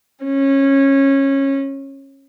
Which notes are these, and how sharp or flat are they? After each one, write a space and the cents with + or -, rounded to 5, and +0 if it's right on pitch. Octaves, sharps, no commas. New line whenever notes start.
C#4 -20